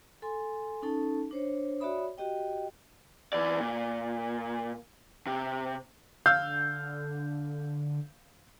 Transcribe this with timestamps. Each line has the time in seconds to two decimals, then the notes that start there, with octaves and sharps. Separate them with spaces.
0.22 A4 G#5 C6
0.82 C#4 D#4 A4 A5
1.31 D4 C5 C#5
1.80 F#4 C#5 D5 E5 B5 D#6
2.18 F#4 G4 D#5 G5
3.33 E3 D5
3.60 A#2
5.27 C3
6.26 D3 F5 E6 G6